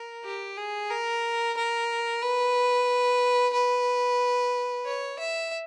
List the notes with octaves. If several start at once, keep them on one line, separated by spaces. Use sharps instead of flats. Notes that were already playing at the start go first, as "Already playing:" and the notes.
Already playing: A#4
G4
G#4
A#4
A#4
B4
B4
C#5
E5